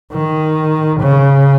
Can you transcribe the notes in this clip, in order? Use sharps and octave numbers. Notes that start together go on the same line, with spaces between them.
D#3
C#3